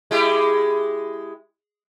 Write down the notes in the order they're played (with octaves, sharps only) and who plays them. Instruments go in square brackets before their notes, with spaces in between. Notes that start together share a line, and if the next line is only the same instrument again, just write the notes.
[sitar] G#3 E4 G4